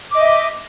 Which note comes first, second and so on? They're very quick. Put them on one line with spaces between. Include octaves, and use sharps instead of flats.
D6 D#5 E5